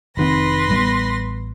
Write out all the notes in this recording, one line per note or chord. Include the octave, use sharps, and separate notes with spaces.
F1 D#3 C4 B4 C6 A#6
A1 G3 B3